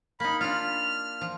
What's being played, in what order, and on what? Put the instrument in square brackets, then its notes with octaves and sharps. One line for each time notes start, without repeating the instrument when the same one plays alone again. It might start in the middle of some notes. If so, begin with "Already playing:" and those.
[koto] A#3 D#4 [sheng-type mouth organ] B5
[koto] D4 F4 [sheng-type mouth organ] F6
[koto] F3